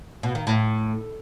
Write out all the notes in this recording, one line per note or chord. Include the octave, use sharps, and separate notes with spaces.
B2
D#3
A2